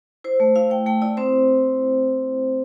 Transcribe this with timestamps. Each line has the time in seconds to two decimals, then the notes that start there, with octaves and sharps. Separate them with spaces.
0.24 E4 C5
0.40 A3
0.56 E4 F5
0.70 A3 G5
0.86 A3 G5
1.02 E4 D5
1.17 C4 C5